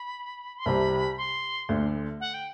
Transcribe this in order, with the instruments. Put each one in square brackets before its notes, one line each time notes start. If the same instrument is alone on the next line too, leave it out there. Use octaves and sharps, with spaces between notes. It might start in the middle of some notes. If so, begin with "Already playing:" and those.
Already playing: [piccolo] B5
C6
[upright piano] C2 C3 G3 [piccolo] B5
[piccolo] C6
[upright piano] D2 D3 A3 D4
[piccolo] F#5
G5